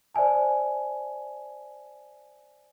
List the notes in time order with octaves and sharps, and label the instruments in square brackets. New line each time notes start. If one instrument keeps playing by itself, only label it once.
[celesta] C5 D5 E5 G#5 A5